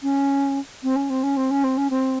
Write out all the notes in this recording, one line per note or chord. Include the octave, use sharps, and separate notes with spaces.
C#4
C4
C#4
C4
C#4
C4
C#4
C4
C#4
C4